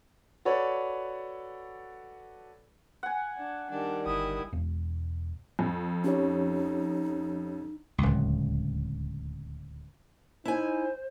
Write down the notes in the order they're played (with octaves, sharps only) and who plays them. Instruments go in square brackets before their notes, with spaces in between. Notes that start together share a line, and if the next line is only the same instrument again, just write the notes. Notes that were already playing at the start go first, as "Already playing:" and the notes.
[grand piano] F#4 A4 B4 C#5 D5
[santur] F#5 G#5
[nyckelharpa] D4
[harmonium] D#3 G3 [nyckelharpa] D4
[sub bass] G1 [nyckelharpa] E4 D#6
[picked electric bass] E1
[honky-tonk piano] F2
[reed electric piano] C#4 G4 C#5 [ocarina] D#4
[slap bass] D1 C#2
[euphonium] D#4 [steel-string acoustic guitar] E4 G#5 [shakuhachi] C5